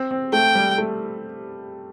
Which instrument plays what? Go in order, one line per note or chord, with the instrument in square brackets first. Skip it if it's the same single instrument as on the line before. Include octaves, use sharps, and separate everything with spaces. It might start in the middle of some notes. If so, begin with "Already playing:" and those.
Already playing: [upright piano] C4
C4
[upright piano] A3 [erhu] G5
[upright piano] G3
A3